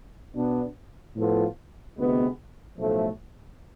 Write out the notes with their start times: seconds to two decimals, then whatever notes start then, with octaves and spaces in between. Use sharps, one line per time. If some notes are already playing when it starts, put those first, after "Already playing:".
0.35 B2 B3 D4
1.16 A2 F3 B3 F4 A4
1.98 D2 C3 G#3 B3
2.78 B1 A2 F3 A3